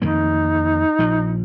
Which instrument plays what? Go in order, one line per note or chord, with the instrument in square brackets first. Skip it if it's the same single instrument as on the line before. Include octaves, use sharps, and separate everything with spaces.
[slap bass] F2 D#3 A#3 [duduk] D#4
[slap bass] A#1 F3